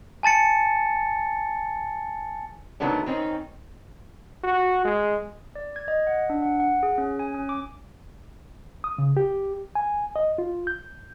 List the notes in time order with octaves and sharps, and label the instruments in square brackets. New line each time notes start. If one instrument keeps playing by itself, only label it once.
[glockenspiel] G#5 A5 A6 C#7
[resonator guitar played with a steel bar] C3 D#3 F#3 A3 B3 D4
D#3 C4 C#4 D#4
[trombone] F#4
G#3
[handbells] D5
G#6
D#5
F#5
D4
F#5
F#5
G#4
C#4
G#5
C#4
D6
[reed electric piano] D#6
C#3
G4
G#5
D#5
F4
G6